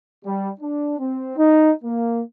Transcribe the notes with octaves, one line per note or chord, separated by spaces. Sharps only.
G3
D4
C4
D#4
A#3